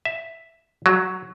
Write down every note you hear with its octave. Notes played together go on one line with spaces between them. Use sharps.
E5
F#3